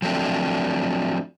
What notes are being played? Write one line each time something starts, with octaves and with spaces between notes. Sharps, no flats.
F3 F#3 A3 C4 D4